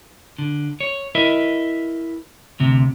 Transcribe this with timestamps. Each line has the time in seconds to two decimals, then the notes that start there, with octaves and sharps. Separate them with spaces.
0.38 D3
0.80 C#5
1.15 E4 A#4 B4 D#5 E5
2.60 D2 C3